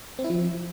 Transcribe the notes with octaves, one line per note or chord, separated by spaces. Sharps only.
C4
E4
F3